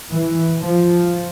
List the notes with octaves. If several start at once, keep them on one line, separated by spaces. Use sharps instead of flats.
E3
F3